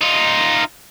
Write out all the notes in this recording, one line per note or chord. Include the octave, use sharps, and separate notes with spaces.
D#4 F4